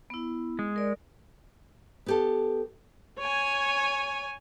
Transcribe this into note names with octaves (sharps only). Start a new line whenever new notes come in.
B3 E4
G#3
A#4 D5
B3 G4 A4
C#5 G#5